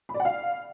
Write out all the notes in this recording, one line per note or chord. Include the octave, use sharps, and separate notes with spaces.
B5
D5
F#5
F5